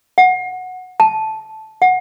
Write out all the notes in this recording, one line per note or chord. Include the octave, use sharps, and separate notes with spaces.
F#5
A5
F#5